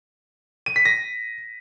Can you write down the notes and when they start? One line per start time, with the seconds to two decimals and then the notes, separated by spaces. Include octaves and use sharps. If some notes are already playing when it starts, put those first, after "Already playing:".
0.66 D#7
0.76 B6
0.85 A#6